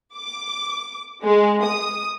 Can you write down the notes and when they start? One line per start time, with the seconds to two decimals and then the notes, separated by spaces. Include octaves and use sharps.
0.16 D6
1.24 G#3
1.63 D#6